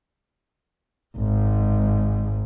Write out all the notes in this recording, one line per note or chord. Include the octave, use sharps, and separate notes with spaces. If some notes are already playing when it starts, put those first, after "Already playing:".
G#1 G#2